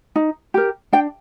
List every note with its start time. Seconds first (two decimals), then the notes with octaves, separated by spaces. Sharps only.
0.16 D#4
0.54 G4 A#4
0.93 D4 G5